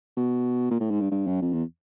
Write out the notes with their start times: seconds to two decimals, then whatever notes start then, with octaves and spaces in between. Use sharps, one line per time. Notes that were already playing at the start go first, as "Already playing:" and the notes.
0.17 B2
0.71 A#2
0.80 A2
0.91 G#2
1.01 G2
1.11 G2
1.27 F#2
1.42 F2
1.53 E2